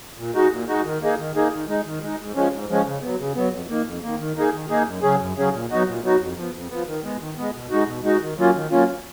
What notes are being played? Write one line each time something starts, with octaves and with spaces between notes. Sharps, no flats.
A#2
G#3 D#4 F#4
A#2
G#3 D#4 F#4
D#3
A#3 D#4 G#4
D#3
A#3 D#4 G#4
D#3
G#3 D#4
D#3
G#3 D#4
G#2
F3 G#3 C#4
G#2
F3 G#3 C#4
C#3
F#3 B3
C#3
F#3 B3
F2
D#3 A#3
F2
D#3 A#3
D#3
A#3 D#4 G#4
D#3
A#3 D#4 G#4
F#2
C#3 F#3 C#4 G#4
F#2
C#3 F#3 C#4 G#4
A#2
F#3 B3 D#4 F#4
A#2
F#3 B3 D#4 F#4
F2
F3
B3
F2
F3 B3
D#3
G#3 B3
D#3
G#3 B3
B2
G#3 D#4 F#4
B2
G#3 D#4 F#4
D#3
F#3 A#3 C#4 F4
D#3
F#3 A#3 C#4 F4